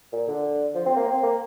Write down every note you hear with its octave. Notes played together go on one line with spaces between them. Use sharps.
A#2
D3
F3
C4
A#3
C4
A#3